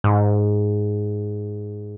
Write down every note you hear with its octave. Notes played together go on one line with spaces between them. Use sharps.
G#2